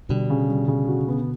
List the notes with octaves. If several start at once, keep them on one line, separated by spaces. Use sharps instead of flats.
B2 D3 G3
C#3
G3
C#3
F#4
B3